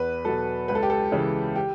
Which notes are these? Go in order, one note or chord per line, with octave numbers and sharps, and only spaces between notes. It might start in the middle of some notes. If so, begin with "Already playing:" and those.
Already playing: E2 B4
B2 F#3 A4
C#2 B4
A4
G4
A4
C#3 E3
G4